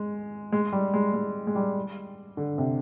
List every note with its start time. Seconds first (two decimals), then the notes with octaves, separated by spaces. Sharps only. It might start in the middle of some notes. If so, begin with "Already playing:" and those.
Already playing: G#3
0.52 G#3
0.72 G3
0.94 G#3
1.14 G#3
1.47 G#3
1.55 G3
2.37 D3
2.58 C3